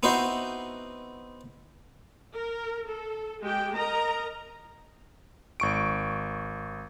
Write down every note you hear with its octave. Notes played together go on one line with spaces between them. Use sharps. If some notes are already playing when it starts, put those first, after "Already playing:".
B3 C4 D#4 E4 F#4 C5
A#4
A4
G#3 G4 G5
A#4 D#5 A#5
G#1 C#6 D7